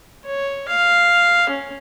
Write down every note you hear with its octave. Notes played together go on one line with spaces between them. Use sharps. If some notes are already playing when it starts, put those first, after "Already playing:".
C#5
F5
C#4